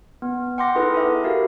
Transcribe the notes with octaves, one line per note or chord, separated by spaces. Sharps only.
B3
F#5 G5 C6 D6 A#6
D#4 E4 G#4 A4 B4
A4 E5
F#4 G4 A#4 F5